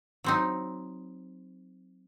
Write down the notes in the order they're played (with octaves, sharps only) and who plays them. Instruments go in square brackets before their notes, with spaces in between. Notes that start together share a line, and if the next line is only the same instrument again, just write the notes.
[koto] F#3 C4 D#4